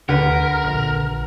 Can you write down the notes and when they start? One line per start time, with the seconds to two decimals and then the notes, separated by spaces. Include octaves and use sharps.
0.09 D2 D3 G4 A#4 B4 F#5
0.64 A#1